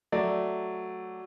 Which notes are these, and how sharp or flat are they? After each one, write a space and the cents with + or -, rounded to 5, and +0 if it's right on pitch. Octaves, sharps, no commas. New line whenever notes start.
F#3 +0 A3 +0 D5 +0